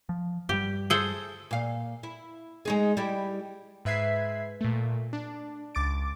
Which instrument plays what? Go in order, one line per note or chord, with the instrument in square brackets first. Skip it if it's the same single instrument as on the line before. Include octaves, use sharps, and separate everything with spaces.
[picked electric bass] F3
[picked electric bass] G2 G3 [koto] G4
[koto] G#4 A4 C5
[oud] A#2 F5
E4
G#3 D#4 G#4
G3 E4 G4
[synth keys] G#2 B4 E5 G#6 B6 C7
A#2 A3
D4
C#2 D6 A6 D7